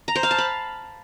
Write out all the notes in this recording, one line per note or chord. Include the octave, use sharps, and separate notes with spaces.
A#5
C5
F5
A5
B5